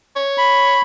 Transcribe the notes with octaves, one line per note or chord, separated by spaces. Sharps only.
C#5
B5